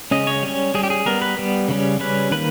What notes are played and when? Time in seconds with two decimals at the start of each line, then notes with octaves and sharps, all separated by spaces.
0.11 C#3 G#3 C#4 D#5
0.27 C#5
0.43 G3 C#4
0.74 G3 C#4 G#4
0.83 G4
0.90 G#4
1.06 G3 B3 A#4
1.22 B4
1.38 G3 B3
1.68 C#3 G3 C#4
2.00 C#3 G3 C#4 B4
2.31 D#3 A#3 B4